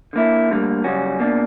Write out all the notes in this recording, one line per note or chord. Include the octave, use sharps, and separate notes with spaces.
D3 A#3 E4
D2 D3 G3 A#3
F#2 C#3 G3 C#4 F#4
B2 A#3 D4